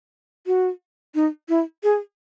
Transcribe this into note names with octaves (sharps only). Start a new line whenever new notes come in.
F#4
D#4
E4
G#4